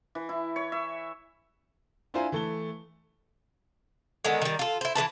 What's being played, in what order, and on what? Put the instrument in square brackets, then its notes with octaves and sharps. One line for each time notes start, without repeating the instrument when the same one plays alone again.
[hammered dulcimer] E3
E4
C#5
E5
[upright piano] D4 E4 F4 C5 G#5 A#5
E3 A3 A5 G7
[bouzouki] D3 D#3 G#3 B3
D#3 G3
F4 A4
E4 C5
E3 G#3 B4 A5